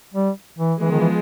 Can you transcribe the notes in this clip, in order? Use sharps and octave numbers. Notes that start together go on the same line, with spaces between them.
G3
E3
E3 F3 G#3 B3
D#3
E3